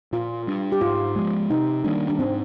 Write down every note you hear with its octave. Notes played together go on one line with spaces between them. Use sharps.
A#2 F4
G3 D4
G4
G#2 F4
F3 G#3
C3 D#4
D#3 G3 A#3 D4
D4
G#2 C4